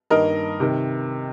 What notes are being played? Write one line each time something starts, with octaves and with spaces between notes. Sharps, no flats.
G2 D#3 A#3 A#4 D#5
C3 D#3